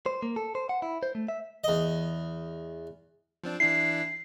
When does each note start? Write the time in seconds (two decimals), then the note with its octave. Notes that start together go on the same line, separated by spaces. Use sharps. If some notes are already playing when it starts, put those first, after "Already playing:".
0.06 C5
0.23 A#3
0.36 A4
0.55 C5
0.69 F#5
0.82 E4
1.03 C5
1.15 A3
1.28 E5
1.64 E2 D#5
3.44 F3 C4 D4
3.60 E3 D4 E4 C7